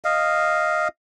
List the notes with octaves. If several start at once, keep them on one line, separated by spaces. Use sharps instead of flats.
D#5 F5